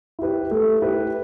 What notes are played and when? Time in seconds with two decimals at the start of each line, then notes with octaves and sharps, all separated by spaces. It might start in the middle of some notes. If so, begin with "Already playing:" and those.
0.19 E4 G4 B4
0.51 A3
0.81 E4 G4 B4